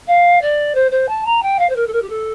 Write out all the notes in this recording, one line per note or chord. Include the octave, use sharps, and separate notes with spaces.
F5
D5
C5
C5
A5
A#5
G5
F5
C5
A#4
A4
A#4
G4
A4